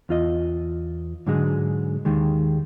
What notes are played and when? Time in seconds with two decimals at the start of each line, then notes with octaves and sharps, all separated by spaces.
0.09 E2 F4 D#5
1.27 G#2 D3 F#3 G#3
2.05 D#2 D#3 G#3